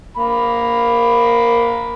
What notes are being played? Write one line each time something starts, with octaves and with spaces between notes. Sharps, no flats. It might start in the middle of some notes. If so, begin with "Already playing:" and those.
A#3 B5